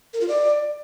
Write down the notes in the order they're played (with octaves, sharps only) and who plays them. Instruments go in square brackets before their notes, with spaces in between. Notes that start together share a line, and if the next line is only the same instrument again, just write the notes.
[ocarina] A#4
F4
D5